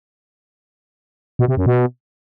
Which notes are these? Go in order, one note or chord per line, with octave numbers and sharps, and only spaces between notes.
B2
C3
F#2
B2